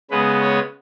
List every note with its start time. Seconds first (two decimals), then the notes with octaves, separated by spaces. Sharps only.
0.11 C#3 G#3 B3 B4
0.41 C#5